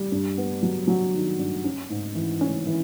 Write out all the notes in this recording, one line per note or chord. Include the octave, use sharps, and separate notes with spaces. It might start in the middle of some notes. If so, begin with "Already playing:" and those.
Already playing: G3
G2
B3
F#3
F#3
D#3
G2
C#4
G#2
E3
C#4
E3